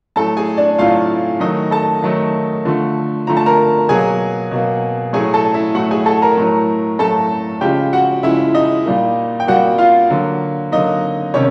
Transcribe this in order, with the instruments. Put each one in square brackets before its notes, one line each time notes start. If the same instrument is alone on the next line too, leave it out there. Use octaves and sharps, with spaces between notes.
[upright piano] A2 F#3 A3 A4 A5
G#4 G#5
D4 D5
A2 F#3 A3 F4 F5
D#3 F#3 A3 D#4 D#5
A4 A5
D#3 F#3 A3
D3 F3 A3
D3 F3 A3 A#5
A5
A#4 A#5
B2 F#3 A#3 G#4 G#5
B2 F#3 A#3
A2 F#3 A3 G#4 G#5
A4 A5
E4 E5
A2 F#3 A3 F#4 F#5
G#4 G#5
A4 A5
A#4 A#5
A2 F#3 A3
A2 F#3 A3 A4 A5
C#3 F3 G#3 G4 G5
F#4 F#5
C#3 F3 G#3 E4 E5
D#4 D#5
A#2 G3 A#3
G5
A#2 G3 A#3 F#4 F#5
F4 F5
D3 F#3 A#3
D3 F#3 A#3 D#4 D#5
C3 D#3 G#3 C#4 C#5